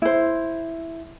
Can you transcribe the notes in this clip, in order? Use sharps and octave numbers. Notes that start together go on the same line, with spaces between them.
E4 C5